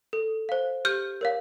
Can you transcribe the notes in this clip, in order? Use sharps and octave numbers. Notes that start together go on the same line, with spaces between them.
A4
C5 F5
G4 F6 G6
A#4 C#5 F5